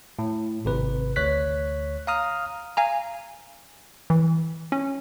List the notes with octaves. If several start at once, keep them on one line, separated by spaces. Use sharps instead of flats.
A2
G#1 C3 B4
D2 C#5 F#6 B6
F5 A#5 D#6 F6
F5 G#5 A#5
E3
C#4